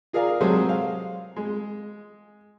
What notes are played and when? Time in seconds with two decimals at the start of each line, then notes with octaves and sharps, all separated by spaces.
0.13 F4 G#4 A#4 D5 F5
0.40 C3 F#3 G#3 G#4 A4 C5
0.69 F5
1.36 G#3